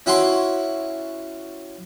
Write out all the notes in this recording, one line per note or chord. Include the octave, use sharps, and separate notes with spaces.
C#4 E4 F#4 F#5 C6 D6